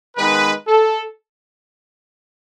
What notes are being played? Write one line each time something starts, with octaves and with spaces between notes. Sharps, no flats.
D#3 G#3 B3 D#4 B4
A4